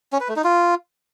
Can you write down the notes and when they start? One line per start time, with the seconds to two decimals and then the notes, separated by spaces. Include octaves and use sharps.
0.13 C#4
0.20 B4
0.28 A3
0.36 D#4
0.44 F4